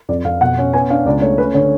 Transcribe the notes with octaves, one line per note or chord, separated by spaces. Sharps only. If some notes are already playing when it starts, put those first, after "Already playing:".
F2 D5
F2 F5
B2 F#5
C#4
B3 G#5
D4 F5
C#2 D5
A3 C#5
C#4 B4
D3 C#5